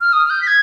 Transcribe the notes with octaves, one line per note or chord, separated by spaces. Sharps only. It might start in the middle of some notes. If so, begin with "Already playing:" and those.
F6
D#6
F6
G6
B6
G#6